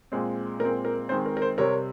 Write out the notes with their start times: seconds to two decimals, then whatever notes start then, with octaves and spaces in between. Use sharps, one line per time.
0.12 A#2 G#3 C4
0.60 A#2 G#3 C4 A#4
0.85 A#4
1.09 D#3 G#3 C4 C5
1.26 A#4
1.37 A#4
1.42 C5
1.58 C3 G3 C4 A#4 C#5